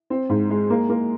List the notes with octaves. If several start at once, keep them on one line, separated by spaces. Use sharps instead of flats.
C4
G#2
G#3
A#3
A#3